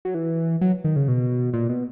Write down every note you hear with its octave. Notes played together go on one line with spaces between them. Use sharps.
F#3
E3
F#3
D#3
C#3
B2
A#2
B2